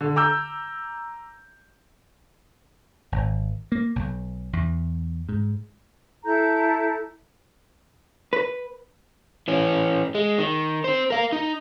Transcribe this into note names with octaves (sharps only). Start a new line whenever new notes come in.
D3
A#5 D6 E6 G6
G#1
A#3
B1
E2
G#2
E4 A4 A#5 G6
B4
E3 C#4
G#3
D#3
C4 C5
A#4 F5
D#4